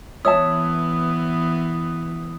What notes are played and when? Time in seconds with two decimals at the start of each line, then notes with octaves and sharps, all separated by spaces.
0.25 E3 B3 C#5 E5 A5 D#6 E6